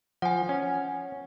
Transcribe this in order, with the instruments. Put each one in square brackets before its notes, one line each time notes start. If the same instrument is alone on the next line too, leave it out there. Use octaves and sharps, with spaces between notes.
[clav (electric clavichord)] F3 [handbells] F#5 G#5
[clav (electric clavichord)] C#4